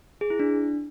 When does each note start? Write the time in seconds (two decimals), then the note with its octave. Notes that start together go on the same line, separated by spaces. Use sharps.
0.21 G#4
0.30 E4
0.39 D4